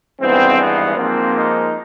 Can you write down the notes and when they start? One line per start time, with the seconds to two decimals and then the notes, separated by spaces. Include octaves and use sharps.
0.20 G#1 G2 E3 G#3 B3 C4
0.58 B3
0.96 G#2 F3 A#3 C4
1.35 D#4